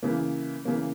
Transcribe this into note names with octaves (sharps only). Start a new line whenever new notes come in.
C#3 E3 A#3
C#3 E3 A#3